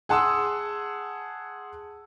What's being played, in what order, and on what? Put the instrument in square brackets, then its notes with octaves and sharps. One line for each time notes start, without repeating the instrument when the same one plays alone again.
[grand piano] G#4 F#5 A5 C6 D#6 E6